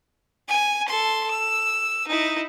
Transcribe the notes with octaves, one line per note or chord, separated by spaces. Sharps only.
G#5
A4 C6
E6
D#4 E4